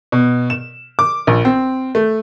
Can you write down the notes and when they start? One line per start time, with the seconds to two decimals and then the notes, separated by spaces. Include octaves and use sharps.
0.12 B2
0.50 E7
0.99 D6
1.27 A#1
1.45 C4
1.95 A3